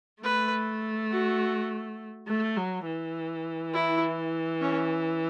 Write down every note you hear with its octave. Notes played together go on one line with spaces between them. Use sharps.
A3 B4
F#4
A3
F#3
E3
E4
C#4